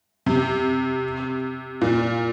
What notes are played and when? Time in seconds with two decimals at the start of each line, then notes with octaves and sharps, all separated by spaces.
0.26 C3
1.81 A#2